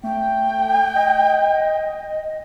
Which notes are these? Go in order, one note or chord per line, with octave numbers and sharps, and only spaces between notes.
A3 G5
D#5